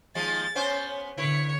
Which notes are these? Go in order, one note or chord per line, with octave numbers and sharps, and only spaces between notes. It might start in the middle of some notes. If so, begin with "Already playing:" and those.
D#2 F3 G#3 A6
B3 C#4 C5
D3 E4 B4 C#5